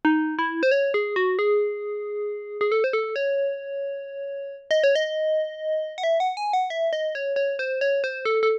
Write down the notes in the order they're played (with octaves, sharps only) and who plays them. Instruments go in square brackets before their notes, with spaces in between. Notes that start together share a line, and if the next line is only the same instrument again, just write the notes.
[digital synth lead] D#4
E4
C5
C#5
G#4
F#4
G#4
G#4
A4
C5
A4
C#5
D#5
C#5
D#5
F#5
E5
F#5
G#5
F#5
E5
D#5
C#5
C#5
C5
C#5
C5
A4
A4